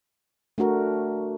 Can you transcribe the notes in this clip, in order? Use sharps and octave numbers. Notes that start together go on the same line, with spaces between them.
A3 D4 F#4 A#4